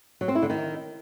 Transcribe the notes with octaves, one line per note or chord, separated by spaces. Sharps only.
F#3
C4
E4
D3
D#3